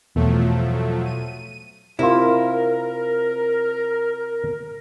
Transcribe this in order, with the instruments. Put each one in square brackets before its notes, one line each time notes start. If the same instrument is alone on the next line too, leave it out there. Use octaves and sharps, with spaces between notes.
[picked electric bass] E2 [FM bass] B2 [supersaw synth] F3 F#3 A3
[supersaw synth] D#7
[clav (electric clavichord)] C3 F4 [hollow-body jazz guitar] E4 [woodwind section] A#4